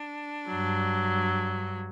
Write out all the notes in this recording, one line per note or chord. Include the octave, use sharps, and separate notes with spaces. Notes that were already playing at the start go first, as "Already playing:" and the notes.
Already playing: D4
G2 F#3